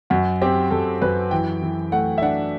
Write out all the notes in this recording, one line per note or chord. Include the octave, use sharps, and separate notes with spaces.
F#2 F#4
C4 G4
F#2 A4
F#2 B4
E3 G5
E3
A3 F#5
E5
D4 F#5